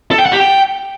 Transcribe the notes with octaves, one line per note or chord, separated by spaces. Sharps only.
A4
G5
F#5
G4
G5